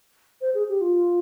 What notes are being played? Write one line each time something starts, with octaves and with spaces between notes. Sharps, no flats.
C5
G#4
G4
F4